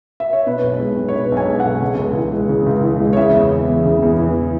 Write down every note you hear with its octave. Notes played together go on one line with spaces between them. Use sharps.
E5
C#5
B2 B4
B1
G#3
B1
C#5
B2 B4
B1
G#5
G#3
B1 F#5
C#3
C#2
E3
G#3
C#3
C#2
E3
G#3
C#5
C#3 E5
E2
E3
E2
C#3
E2
E3